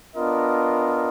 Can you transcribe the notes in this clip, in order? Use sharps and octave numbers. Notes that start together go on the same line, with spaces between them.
B3 D4 F4 A#4 D#5